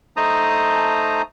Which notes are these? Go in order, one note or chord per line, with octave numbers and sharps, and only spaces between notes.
A3 D#4 C5 A5 A#5 D#6